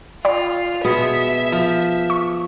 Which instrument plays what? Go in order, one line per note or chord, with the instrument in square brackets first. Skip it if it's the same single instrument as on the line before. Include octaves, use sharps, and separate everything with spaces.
[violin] F4 [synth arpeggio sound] D5 G5 B5
[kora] B2 B3 G#4 [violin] E5
[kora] F3
[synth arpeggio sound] C#6